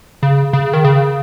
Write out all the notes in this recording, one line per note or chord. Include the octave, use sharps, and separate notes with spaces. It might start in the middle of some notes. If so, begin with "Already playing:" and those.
C#3
C#3
D#3
C#3